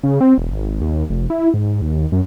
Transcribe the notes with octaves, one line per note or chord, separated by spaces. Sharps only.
C#3
C4
E1
G#1
D#2
F1
E4
G#2
D#2
F#2